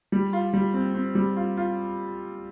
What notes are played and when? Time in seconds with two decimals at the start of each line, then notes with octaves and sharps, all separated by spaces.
0.12 G3
0.33 F4
0.53 G3
0.74 C4
0.94 C4
1.15 G3
1.36 F4
1.57 F4